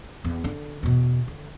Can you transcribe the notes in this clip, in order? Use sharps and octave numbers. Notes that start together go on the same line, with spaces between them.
E2
D3 D4
E2 B2
D3